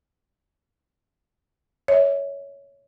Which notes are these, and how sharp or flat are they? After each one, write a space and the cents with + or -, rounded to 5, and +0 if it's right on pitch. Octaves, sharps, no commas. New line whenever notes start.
C#5 +15 E5 -25